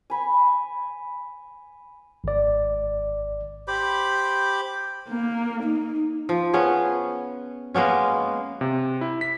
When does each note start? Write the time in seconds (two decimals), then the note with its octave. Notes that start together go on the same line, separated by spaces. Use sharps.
0.10 G#5 B5
2.24 G#1 D5
3.68 G4 C5 B5 D6
5.08 A#3
5.63 D#4
6.29 F3
6.53 B3 C#4 G#4
7.74 G#3 A#3 B3 C#4
8.61 C3
9.01 E4
9.21 B6